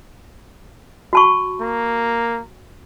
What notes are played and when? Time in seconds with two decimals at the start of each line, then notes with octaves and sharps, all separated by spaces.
1.13 F#4 A5 C#6
1.61 A#3 A#5